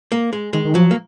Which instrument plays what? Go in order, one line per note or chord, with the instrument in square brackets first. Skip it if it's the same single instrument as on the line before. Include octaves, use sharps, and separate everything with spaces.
[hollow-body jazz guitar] A#3
G#3
[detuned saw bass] D#3 [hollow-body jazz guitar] G#3
[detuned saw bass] D#3
[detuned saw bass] F3 [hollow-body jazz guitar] F#3
[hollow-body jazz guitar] A#3